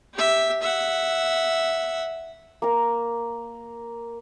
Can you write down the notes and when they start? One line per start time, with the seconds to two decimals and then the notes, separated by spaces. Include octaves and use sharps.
0.14 G4 E5
0.62 E5 F#5
2.62 A#3 A#5